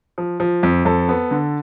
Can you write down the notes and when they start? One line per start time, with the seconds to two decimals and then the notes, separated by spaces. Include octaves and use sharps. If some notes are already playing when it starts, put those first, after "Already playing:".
0.18 F3
0.40 F3
0.63 F2
0.85 F2 A4
1.09 B3
1.31 D3